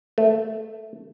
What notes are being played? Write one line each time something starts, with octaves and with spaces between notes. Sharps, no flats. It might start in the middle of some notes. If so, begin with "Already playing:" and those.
A3